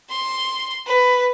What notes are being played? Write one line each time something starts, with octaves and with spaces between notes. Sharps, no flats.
C6
B4